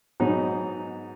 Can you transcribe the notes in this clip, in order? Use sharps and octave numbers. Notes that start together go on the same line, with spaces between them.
G#2 F#3 B3 D#4